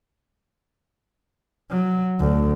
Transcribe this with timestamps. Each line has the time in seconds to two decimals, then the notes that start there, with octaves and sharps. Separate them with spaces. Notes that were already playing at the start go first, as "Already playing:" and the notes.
1.71 F#3
2.20 D2